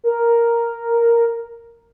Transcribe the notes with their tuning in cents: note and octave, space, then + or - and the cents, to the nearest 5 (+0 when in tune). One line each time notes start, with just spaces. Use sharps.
A#4 +0